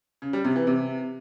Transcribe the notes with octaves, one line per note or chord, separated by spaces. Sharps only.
C#3
G3
C3
E3
C3